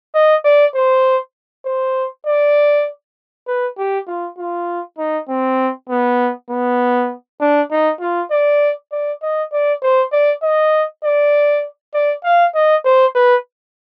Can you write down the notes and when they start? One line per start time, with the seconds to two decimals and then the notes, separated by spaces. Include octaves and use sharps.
0.15 D#5
0.45 D5
0.75 C5
1.66 C5
2.26 D5
3.47 B4
3.78 G4
4.08 F4
4.38 F4
4.99 D#4
5.29 C4
5.90 B3
6.50 B3
7.41 D4
7.71 D#4
8.01 F4
8.32 D5
8.92 D5
9.22 D#5
9.53 D5
9.83 C5
10.13 D5
10.43 D#5
11.04 D5
11.94 D5
12.24 F5
12.55 D#5
12.85 C5
13.15 B4